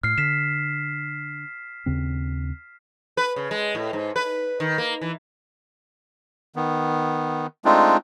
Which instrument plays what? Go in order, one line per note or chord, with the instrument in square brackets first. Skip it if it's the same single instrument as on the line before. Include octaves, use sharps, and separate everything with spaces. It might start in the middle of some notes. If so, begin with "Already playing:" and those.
[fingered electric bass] A2 [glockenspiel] F6 C7
[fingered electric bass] D3 [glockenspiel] B6 E7
[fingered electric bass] D#2 C#3 C4
[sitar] B4
C#3
G#3
A2
G#2
B4
D#3
A#3
E3
[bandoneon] D#3 B3
G#3 A3 C4 D4 D#4 F4